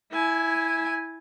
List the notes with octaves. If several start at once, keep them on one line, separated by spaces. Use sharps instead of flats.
E4 G#5